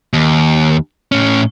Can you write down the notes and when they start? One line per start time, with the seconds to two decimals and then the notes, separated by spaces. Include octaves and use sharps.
0.13 D#2
1.12 A2 C#4